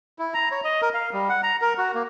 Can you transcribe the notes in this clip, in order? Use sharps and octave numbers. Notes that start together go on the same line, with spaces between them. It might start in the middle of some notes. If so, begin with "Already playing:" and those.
E4
A#5
C#5
D#5
A#4
F5
G3
F#5
A#5
A#4
F#4
A#3